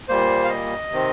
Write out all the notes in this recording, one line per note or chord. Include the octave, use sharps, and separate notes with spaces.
A#2 G3 A#3 C5
F5
D#5
C3 D#3 C4